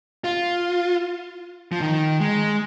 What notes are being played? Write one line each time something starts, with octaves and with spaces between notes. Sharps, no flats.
F4
F3
D#3
G#3